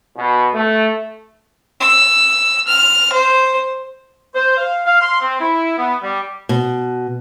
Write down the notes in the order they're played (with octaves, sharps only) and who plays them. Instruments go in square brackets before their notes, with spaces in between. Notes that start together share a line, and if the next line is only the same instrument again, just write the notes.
[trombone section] B2
A3
[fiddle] E6
F6
C5
[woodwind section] C5
F5
F5
C6
C4
E4
B3
G3
[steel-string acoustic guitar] B2